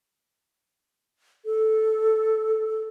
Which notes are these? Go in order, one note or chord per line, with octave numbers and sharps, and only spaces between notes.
A4